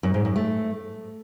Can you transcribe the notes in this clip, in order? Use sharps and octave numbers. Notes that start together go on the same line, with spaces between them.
F#2
G#2
F#2
A3